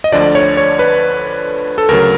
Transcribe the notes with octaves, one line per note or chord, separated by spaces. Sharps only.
D#5
D2 D3 F3 D5
C#5
C#5
B4
A4
D2 C#3 F#3 A#4